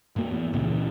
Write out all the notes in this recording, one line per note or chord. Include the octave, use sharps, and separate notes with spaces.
G2 A#3
E2
C#2 A#2 C#3 E3